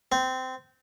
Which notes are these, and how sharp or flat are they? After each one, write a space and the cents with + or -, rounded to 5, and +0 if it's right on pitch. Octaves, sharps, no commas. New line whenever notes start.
C4 -20